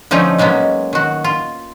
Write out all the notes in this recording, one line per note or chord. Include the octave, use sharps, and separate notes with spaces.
D3 F3 A3 C#4 D#4
F#3 G#3 A#3 B3 C#4
D#3 F#4
F4